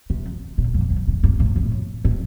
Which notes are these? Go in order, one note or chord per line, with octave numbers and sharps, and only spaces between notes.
C3
A#2
F2
F2
G2
G2
A2
A2
A2